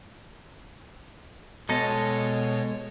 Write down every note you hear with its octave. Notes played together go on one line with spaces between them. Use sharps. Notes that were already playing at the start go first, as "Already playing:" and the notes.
B2 G#3 B3 A4 C#5 D#5